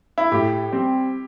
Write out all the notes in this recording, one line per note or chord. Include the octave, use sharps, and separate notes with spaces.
E4
A2 G4
G3 C4